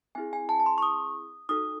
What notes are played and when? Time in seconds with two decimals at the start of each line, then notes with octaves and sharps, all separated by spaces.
0.15 C4 E4 G#4 G#5
0.33 G#5
0.49 A5
0.60 A5
0.66 C6
0.78 C#6
0.82 D#6
1.49 D#4 F#4 A4 D#6